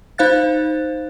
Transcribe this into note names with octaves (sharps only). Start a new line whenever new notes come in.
D#4 C5 F5 F#6 A6